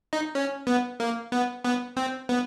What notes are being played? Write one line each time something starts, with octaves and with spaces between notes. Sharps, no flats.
D#4
C#4
B3
A#3
B3
B3
C4
B3